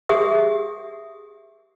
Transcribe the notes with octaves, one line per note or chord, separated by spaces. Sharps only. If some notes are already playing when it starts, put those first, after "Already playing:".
G4 G#4 E5 D#6